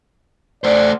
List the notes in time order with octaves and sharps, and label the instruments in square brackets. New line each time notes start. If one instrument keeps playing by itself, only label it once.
[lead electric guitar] A3 C5 [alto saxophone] D5